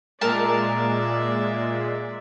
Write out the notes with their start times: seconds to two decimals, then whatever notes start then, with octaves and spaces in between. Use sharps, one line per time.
0.21 A#2 G#3 A#4 D5 E5 A5